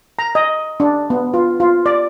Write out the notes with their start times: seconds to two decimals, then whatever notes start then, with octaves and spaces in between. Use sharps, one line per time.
0.19 A#5
0.35 D#5
0.80 D4
1.10 B3
1.34 F4
1.60 F4
1.86 D5